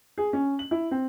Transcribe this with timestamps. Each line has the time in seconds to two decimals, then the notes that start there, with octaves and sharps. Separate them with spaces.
0.18 G#4
0.33 C#4
0.59 F#7
0.71 E4
0.91 C4